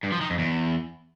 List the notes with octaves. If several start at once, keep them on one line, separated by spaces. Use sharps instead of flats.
G2
F3
D#3
F2
E2